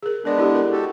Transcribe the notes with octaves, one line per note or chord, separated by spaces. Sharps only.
G#4 A#4
G#3 B3 D4 A#4 D5
E4 G4 A4
A#4 F#5
F#4 G4 A4